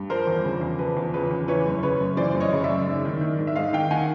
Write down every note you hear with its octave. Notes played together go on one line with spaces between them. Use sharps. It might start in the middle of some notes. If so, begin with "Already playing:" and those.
Already playing: G2
F3 A#4 C5
E2
C#3
E2
F3 B4
E2
C#3 B4
E2
E3 B4 C#5
F#2
C#3 B4 C#5
F#2
E3 C5 D5
F#2
C#5 D#5
C#3
D5 E5
F#2
G#2
D#3
D#3
G#2
E5
G#2 D#5 F5
D#3 F5 G5
D#3 F#5 G#5